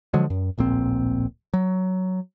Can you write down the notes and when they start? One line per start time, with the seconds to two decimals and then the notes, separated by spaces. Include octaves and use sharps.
0.14 D3 F3 F#3 G#3
0.30 F#2
0.58 D1 A#1 A#2 C4
1.54 F#3